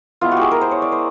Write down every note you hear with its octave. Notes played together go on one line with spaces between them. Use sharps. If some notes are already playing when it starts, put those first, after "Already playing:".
G#3 B3 E4 F4
F#4
G4 G#4
A#4
C5
C#5
D5
C5